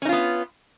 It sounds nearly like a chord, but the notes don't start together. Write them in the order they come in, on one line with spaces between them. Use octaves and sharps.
C#4 D#4 F4 B3